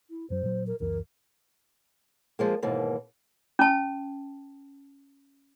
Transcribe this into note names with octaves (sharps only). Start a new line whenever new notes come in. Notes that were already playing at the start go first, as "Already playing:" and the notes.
E4
F#2 F#3 C5
A#2 F#3
A#4
C#2 F#2 E3 A#4
F3 G#3 A#3
D#2 G#2 B2 E3 A#3
C#4 A5